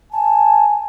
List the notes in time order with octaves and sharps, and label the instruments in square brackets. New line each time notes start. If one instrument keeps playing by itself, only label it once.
[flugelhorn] G#5 [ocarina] A5